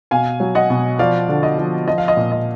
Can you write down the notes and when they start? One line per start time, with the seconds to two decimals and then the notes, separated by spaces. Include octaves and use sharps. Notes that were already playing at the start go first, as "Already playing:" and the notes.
0.11 B2 F5 G#5
0.40 F#3
0.55 D#5 F#5
0.70 B2
0.99 F3 D5 F5
1.29 D3
1.43 D#5
1.58 F3
1.87 F3 D#5
1.98 F5
2.08 D#5
2.17 A#2
2.31 D#5